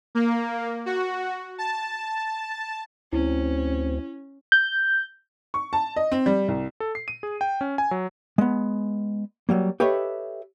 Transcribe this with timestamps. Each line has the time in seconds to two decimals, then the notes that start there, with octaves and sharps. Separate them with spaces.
0.15 A#3
0.86 F#4
1.58 A5
3.13 D2 C4 C#4 E4
4.52 G6
5.54 C#6
5.73 A5
5.96 D#5
6.12 C4
6.26 G3
6.48 C2
6.80 A4
6.95 C7
7.08 D#7
7.23 G#4
7.41 G5
7.61 C#4
7.78 G#5
7.91 F#3
8.38 G#3 B3
9.49 F#3 G3 A#3
9.80 G4 A4 B4 C#5 D#5 E5